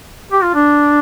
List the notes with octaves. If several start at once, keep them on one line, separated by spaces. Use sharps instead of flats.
G4
F4
D4